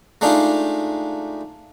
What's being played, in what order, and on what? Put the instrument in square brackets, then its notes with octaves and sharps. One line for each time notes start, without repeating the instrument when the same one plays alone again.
[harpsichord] G#3 A3 D4 D#4 F4